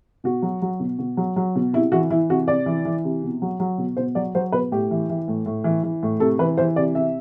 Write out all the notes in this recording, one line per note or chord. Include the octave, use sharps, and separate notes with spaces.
B2 F#4
F#3
F#3
B2
B2
F#3
F#3
B2
C3 E4
E3 F#4
E3 E4
C3 F#4
C3 D5
E3
E3
C3
B2
F#3
F#3
B2
B2 C5
F#3 D5
F#3 C5
B2 B4
A2 G4
E3
E3
A2
A2
E3
E3
A2
C3 A4
E3 B4
E3 C5
C3 D5
C3 E5